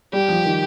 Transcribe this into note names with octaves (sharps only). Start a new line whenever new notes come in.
G3 G4
F3
D#3